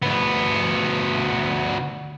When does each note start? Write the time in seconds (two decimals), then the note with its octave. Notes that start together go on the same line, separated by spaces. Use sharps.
0.02 D2 B3